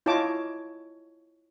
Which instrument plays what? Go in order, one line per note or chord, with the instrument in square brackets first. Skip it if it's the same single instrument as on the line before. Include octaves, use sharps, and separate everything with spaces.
[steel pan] E4 F4 C#5 D#5 A5 D6